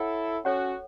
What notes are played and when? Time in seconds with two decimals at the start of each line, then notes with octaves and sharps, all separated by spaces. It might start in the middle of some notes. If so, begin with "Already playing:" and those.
Already playing: E4 A4 C#5 F#5
0.45 C#4 F#4 A4 C#5 F#5